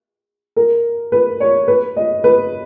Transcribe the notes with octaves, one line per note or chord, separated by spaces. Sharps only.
A#4
B4
C#5
B4
D#5
B4